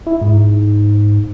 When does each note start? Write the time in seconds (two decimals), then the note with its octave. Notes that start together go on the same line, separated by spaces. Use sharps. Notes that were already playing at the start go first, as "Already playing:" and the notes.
0.06 E4
0.21 G#2